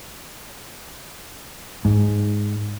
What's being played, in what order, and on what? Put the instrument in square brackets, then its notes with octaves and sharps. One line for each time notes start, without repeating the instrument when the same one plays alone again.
[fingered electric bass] G#2